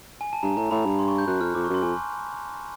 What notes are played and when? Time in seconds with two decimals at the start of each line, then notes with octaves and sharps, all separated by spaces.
0.21 G#5
0.33 A5
0.43 G2 A#5
0.57 A2 A#5
0.71 A2 B5
0.86 G2
0.99 C6
1.08 C#6
1.18 G6
1.27 F#2 F#6
1.41 F2 F6
1.55 F2 D6
1.64 C#6
1.69 F#2
1.74 C6
1.83 F2 G#5